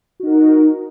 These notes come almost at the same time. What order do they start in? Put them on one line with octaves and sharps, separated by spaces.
F#4 D#4 A#4